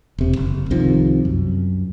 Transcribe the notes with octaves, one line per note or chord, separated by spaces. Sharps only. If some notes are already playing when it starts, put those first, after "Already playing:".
E1 C3
F#1
C2 C3 D#3 F3
F#2